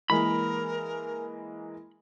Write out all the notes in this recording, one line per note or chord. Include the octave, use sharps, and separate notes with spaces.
E3 G#3 A#3 A#4 B5